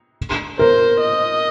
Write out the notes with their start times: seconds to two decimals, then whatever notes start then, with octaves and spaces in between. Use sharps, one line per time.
0.59 A#4 C5
1.01 D#5